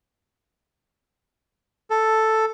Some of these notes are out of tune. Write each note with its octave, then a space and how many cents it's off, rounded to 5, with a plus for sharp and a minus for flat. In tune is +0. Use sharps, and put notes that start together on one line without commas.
A4 +0